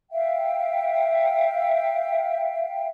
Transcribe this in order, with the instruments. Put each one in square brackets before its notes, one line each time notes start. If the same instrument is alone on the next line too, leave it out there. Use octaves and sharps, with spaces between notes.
[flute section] E5 F5 G5